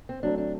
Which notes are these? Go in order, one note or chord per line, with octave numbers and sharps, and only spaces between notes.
C4
F#3 A3 C4 D4
D4